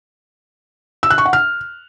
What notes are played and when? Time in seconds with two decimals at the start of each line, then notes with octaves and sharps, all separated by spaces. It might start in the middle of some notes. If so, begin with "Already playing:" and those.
1.03 E6
1.10 F#6
1.18 C#6
1.26 F#5
1.33 F6